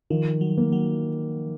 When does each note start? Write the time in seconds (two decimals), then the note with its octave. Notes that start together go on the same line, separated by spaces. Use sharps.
0.10 D#3 F3
0.41 F#3
0.58 A#3
0.72 F#3